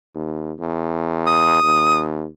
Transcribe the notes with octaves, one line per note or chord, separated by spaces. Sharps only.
D#2
E2
D#6
D#2